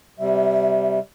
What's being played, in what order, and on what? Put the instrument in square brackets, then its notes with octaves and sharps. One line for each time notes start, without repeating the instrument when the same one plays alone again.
[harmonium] C3 G3 [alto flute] E5